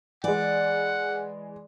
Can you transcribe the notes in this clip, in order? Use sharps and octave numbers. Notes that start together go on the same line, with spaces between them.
E3 G#3 D5 F#5